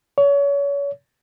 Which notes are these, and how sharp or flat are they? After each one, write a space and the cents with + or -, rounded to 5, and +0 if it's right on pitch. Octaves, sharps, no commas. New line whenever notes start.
C#5 +35